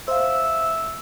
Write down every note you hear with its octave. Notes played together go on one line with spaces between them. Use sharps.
C5 E5 F5